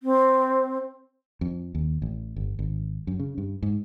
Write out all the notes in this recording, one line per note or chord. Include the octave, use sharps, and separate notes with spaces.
C4
F2
D#2
A1
G1
G#1
F#2
C#3
G2
G#2